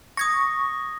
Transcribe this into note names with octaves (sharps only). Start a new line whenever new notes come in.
C#6 D#6 G#6 A#6